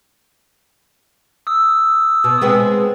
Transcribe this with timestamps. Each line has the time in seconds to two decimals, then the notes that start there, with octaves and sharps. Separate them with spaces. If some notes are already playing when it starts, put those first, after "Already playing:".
1.47 D#6 E6
2.24 B2
2.41 G#3 B3 C4